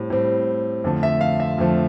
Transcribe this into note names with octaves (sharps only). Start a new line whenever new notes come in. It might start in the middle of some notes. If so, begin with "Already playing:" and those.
Already playing: A2 G3 C4
A2 G3 C4
F2 D3 F3 A3
E5
F5
E5
F2 D3 F3 A3